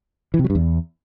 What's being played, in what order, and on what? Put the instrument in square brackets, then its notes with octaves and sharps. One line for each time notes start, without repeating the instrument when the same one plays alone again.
[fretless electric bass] E3
C3
F#3
G2
E2